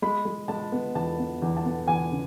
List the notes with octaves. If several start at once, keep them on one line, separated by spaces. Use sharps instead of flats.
G#3 B5
G#3
G#3 A5
B3
E2 A5
B3
E2
A5
B3
E2 G#5
C#3